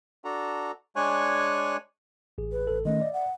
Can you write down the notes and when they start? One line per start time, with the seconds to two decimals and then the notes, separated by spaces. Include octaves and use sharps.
0.25 D4 F#4 A4 A#5
0.96 G#3 D4 C#5 G#5 C#6 F#6
2.38 A1 G#4
2.52 B4
2.67 A1 A4
2.85 D#3 A3 C#4 D#5
3.01 D5 E5
3.13 F#5